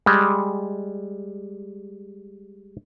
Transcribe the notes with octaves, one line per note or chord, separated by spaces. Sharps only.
G3 G#3